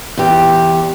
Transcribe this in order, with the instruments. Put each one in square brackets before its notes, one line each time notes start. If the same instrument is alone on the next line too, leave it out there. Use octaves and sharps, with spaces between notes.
[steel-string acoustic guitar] E2 G4